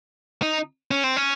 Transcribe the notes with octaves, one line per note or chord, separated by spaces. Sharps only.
D#4
C#4
C4
C#4